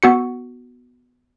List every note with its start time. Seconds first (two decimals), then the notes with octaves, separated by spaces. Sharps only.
0.03 B3 F#4 C#7